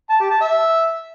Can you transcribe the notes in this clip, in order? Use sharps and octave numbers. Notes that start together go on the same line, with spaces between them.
A5
G4
A5
E5